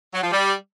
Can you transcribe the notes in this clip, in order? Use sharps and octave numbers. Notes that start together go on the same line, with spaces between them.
F#3
F3
G3